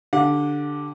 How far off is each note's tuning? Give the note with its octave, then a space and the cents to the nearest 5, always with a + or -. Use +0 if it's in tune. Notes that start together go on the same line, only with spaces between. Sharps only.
D3 +0 G4 +0 F#5 -35